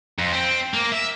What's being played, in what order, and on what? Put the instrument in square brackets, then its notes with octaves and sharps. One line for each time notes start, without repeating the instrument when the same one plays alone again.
[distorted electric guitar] F2
C4
A#3
E5